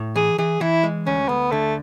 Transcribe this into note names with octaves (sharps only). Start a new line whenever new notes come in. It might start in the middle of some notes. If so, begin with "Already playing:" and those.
Already playing: A2
E3 G#4
E3 G#4
E3 E4
G#3
D2 C#4
D2 B3
D3 A3